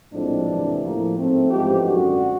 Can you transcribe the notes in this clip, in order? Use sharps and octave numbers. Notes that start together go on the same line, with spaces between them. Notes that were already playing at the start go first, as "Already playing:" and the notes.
A#1 A2 F3 G#3 C4 D4
D2 C3 E3
A2 F3 A#3
G#2 F3 A3 C4
A1 G#2 F3 G#3 B3 G4
G#1 F#2 D3 F#4